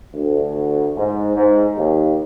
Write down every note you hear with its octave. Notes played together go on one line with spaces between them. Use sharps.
D2
G#2
G#2
D#2